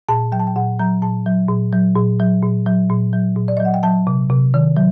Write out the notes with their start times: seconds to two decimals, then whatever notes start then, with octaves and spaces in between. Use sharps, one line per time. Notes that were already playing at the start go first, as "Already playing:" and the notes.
0.09 A#2 A5
0.32 F#3 G5
0.39 A5
0.47 G5
0.56 A#2 F#5
0.79 F#3 A#5
1.02 A#2 A5
1.26 F#3
1.49 A#2
1.72 F#3
1.96 A#2
2.20 F#3
2.42 A#2
2.66 F#3
2.90 A#2
3.13 F#3
3.36 A#2
3.48 D5
3.57 F#3 D#5
3.65 F#5
3.74 G5
3.83 F#3 A5
4.07 C3
4.29 C3
4.54 D#3
4.76 F#3